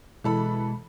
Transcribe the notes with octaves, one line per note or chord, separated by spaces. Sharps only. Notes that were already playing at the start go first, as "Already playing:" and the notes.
B2 E3 G#3 A4 B5